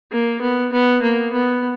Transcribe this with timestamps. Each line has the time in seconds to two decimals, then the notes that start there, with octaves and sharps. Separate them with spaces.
0.11 A#3
0.41 B3
0.72 B3
1.02 A#3
1.33 B3